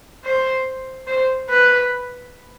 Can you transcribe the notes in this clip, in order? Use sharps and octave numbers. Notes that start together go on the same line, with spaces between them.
C5
C5
B4